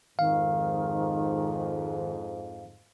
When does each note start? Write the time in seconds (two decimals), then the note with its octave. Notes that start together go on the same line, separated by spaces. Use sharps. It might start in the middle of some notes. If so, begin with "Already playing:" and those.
0.19 F2 G#2 D#3 F5